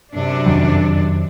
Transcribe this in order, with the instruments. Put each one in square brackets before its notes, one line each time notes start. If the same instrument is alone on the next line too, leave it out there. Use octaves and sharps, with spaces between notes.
[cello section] F#2 C3 D4
[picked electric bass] F2 D#3 F#3